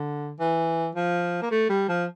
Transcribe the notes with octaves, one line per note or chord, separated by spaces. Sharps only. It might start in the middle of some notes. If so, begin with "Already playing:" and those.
Already playing: D3
E3
F3
A#3
A3
G3
F3